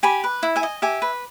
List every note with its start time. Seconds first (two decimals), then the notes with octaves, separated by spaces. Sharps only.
0.03 G4 G#5 B5
0.24 B4
0.43 E4
0.56 E5 G#5
0.63 D#5
0.82 G4 E5 G#5
1.02 B4